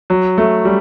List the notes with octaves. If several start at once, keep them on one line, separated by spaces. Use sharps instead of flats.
F#3
A3
G3